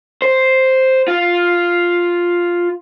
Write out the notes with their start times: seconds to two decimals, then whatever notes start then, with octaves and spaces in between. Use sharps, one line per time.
0.22 C5
1.08 F4